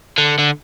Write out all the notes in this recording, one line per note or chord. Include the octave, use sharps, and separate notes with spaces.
D3
D3